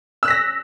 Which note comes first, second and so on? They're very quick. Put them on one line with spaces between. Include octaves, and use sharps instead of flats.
E6 F#6 B6 A#6